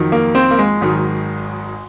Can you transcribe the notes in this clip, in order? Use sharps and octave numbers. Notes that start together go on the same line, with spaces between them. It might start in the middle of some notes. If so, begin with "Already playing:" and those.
Already playing: F2 D#3 F#3
A#3
C4
A#3
G#3
G#1 G#2 D#3 F#3